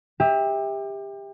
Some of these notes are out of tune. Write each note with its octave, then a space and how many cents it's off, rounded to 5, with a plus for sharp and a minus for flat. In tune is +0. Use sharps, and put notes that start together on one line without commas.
G4 +25 E5 -20